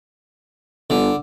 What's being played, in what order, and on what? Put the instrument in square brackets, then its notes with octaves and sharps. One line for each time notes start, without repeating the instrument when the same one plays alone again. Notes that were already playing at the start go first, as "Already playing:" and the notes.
[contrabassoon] G1 [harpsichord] D3